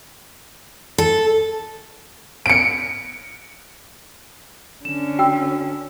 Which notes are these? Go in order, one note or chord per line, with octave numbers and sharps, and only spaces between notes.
A4
C#7 D7
D3 C#4 E7
F#4 G5 E6